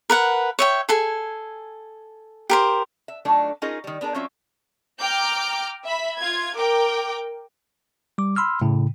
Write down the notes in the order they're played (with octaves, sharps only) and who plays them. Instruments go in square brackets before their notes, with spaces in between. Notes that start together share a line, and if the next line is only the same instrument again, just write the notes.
[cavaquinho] A#4 B4 F#5
C#5 E5 G5
G#4 A4 G#5
G4 A#4 C5
[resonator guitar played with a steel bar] E5
F#3 A3 D4 D#4 F4
C#4 D#4 F4 G#4 A#4 D#5
D#3 G3
B3 D4 G#4 A#4
F#3 C4 C#4 F4 E5
[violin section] G5 A#5 D6 F6 G6
E5 B5 B6
F4 G#6
A#4 G5 D6
[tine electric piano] G3 D6
B5 C6 E6 F6
A2 C#3